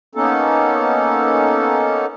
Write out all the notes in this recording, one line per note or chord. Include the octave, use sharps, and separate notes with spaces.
A#3 B3 C#4 D#4 A4